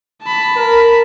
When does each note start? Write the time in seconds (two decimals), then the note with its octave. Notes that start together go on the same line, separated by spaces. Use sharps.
0.23 A5 B5
0.56 A#4